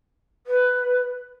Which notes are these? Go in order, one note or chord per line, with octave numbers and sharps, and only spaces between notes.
B4